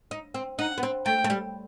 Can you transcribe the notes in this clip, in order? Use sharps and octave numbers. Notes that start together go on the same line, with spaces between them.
D#4
C4
D#4 F#5
B3
C4
A3 G5
A3
G3